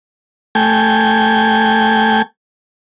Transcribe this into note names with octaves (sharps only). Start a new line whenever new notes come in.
A3 G5 G#5